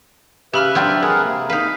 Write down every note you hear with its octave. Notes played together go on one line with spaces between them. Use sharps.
C#3 G4 B4 E5 B5 F6
F#3 C4 D4
G#3 G#4 A#4 F#5
C3 A#3
D#4 B4 F5